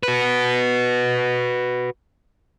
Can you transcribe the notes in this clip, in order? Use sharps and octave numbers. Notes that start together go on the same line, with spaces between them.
F#4 B4